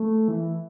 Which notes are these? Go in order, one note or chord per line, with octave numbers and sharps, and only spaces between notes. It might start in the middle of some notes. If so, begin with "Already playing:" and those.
Already playing: A3
E3